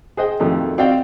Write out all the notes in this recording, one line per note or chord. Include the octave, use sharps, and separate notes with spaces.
G#4 C5 D#5 G5
F2 A#2 D#3 F#3 A3
C4 F#4 D5 D#5 F5 G5